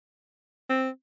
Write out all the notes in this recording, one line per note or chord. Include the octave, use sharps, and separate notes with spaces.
C4